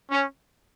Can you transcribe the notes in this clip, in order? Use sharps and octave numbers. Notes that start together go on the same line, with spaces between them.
C#4